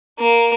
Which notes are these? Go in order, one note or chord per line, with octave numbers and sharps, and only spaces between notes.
A#3